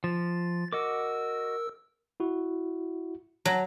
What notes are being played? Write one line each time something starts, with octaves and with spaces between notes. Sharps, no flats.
F3 A6
F#4 A#4 D#5 D6 E6
E4 F#4
F#3 A5